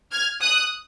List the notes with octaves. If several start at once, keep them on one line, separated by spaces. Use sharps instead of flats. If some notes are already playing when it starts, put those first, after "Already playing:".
F6 G#6
D#6 F#6